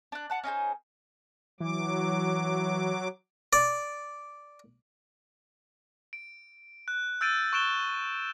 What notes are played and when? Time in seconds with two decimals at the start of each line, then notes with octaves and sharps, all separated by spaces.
0.12 D4 F#6
0.30 F#5 A5 F#6
0.44 C#4 D#4 G#4 C5
1.60 E3 F#3 D6
3.53 D5
6.13 D7
6.88 F#6
7.21 E6 G6 A6 D7 D#7
7.53 C#6 F#6 D7 E7 G7